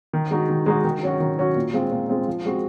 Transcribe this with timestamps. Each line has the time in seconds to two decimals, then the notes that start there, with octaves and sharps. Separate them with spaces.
0.13 D#3
0.31 G#3 D#4 F#4
0.50 D#3
0.66 G#3 D#4 F#4
0.84 D#3
1.03 F#3 C#4 F#4
1.20 D#3
1.38 F#3 C#4 F#4
1.56 A#2
1.73 G#3 C4 F4
1.91 A#2
2.09 G#3 C4 F4
2.27 F3
2.45 G#3 C4 F#4